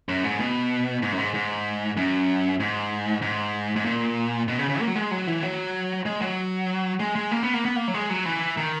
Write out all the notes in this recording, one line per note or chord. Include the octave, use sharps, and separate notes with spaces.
F#2
G#2
B2
G#2
F#2
G#2
G#2
F#2
G#2
G#2
G#2
A#2
B2
C#3
C#3
A#3
F#3
G#3
F#3
E3
F#3
G#3
F#3
G#3
G#3
A#3
B3
A#3
B3
A#3
F#3
G#3
F#3
E3
D#3